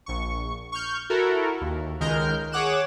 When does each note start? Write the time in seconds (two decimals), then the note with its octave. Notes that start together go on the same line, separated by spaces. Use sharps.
0.06 A#1 C#6
0.72 C#6 F6 G6
1.10 E4 F#4 A4 A#4
1.61 D#2
2.00 C#2 D#3 G#3 A#4 F6 G6
2.52 G#4 C#5 F#5 D6 F#6 E7